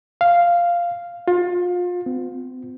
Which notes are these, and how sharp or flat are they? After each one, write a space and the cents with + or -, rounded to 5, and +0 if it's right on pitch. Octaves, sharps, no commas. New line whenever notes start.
F5 -5
F4 +30
C4 -40